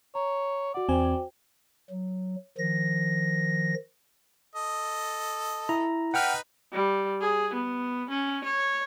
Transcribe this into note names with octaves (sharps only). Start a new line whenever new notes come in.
C#5 A#5
F#4 D5 F#5
E2 C4 F#4 C5 G5 G#5
F#3
D#3 F3 A#6
A4 D#5
E4 A#5
D#4 B4 F#5 G5 F6
G3
G#4
B3
C#4
C#5